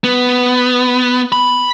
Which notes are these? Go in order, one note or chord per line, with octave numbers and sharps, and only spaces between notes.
B3
B5